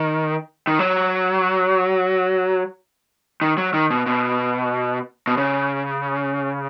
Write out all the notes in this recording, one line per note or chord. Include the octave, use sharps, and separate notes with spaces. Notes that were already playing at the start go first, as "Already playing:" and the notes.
Already playing: D#3
D#3
F#3
D#3
F#3
D#3
B2
B2
B2
C#3